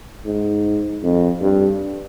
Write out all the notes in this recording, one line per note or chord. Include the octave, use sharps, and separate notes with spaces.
G#2
F2
G2